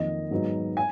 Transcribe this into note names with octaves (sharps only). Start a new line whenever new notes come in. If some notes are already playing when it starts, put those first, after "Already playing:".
Already playing: F2 D#3 A#3 D#5
G#2 F#3 B3 D#4
G#5